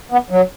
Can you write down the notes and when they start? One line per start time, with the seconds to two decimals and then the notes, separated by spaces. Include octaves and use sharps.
0.12 B3
0.30 F#3